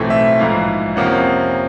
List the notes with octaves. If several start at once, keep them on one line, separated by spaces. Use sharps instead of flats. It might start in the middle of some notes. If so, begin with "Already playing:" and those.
Already playing: B1 A2 E3 A3 C4
E5
A#1 G#2 E3 F5
F2 C3 F3 A#3 C#4 F#5